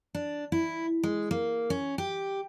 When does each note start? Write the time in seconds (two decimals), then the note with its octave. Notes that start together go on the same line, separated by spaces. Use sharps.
0.15 D4
0.52 E4
1.03 G#3
1.31 A#3
1.70 C#4
1.98 G4